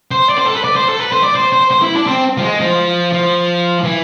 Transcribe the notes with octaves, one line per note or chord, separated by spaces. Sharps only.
C5
D5
C5
A4
B4
D5
C5
A4
B4
C5
D5
C5
C5
C5
E4
D4
C4
F3
G#3
F3
F3
E3